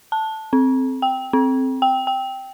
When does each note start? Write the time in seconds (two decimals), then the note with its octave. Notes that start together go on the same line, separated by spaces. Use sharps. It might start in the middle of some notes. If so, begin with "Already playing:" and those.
0.12 A5
0.53 C4
1.02 G5
1.33 C4
1.82 G5
2.07 G5